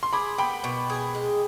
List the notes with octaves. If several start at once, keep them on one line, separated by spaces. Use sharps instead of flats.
C6
G#4 B5 D6
B3 G5 B5
B2
G#4
G#3